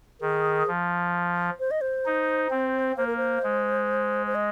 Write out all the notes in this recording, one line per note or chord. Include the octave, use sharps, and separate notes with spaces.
D#3 G#4
F3
C5
D#5
C5
D#4
C4
A#3 C5
A#4
C5
G#3
C5
D#5